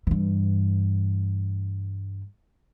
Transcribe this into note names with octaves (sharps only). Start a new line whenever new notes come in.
G2 E3